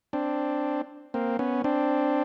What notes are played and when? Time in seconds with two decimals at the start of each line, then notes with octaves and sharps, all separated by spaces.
0.13 C4 D4
1.14 A#3 C4
1.39 B3 C#4
1.64 C4 D4